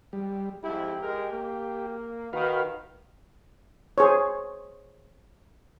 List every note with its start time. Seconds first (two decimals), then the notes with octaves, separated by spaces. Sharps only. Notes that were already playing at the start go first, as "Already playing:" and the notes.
0.13 G3
0.64 F2 G#2 E4 G4
1.02 G#3 A#4
1.31 A#3
2.33 D#3 F#4 B4 F5
3.98 G#4 C5 C#5